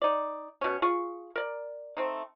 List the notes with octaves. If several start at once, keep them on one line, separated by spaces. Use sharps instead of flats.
D#4 D5
B2 C#4
F4 G#4 C#6
A#4 D5
A3 C4 D#4